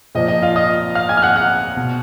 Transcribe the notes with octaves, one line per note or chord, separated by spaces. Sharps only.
A#2 F3 D#5
D#5
F4 F5
D#5 D#6
F5 F6
G#5 G#6
F6
F#5 F#6
F#5 F#6
B2